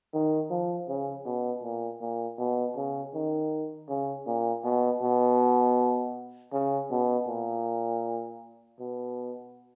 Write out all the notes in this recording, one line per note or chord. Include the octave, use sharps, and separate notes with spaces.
D#3
F3
C#3
B2
A#2
A#2
B2
C#3
D#3
C#3
A#2
B2
B2
C#3
B2
A#2
B2